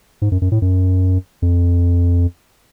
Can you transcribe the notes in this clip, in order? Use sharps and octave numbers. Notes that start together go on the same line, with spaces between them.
G#2
F#2
F#2
A2
F#2
F2